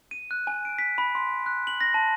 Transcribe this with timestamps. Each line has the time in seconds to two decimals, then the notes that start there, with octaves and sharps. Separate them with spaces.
0.11 D#7
0.31 F#6
0.47 G#5
0.65 D7
0.78 B6
0.98 B5
1.15 C6
1.46 F#6
1.67 F#7
1.81 A#6
1.94 A5